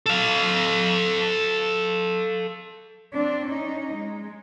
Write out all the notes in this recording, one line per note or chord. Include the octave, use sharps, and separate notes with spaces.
A4 F5
C4 D4
C#4 D#4
G#3